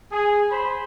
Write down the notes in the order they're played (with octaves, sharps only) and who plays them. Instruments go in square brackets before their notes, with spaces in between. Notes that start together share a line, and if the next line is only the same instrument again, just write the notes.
[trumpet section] G#4
C5 B5